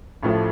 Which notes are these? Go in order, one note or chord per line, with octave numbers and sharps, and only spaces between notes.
A1 A2 F3 A3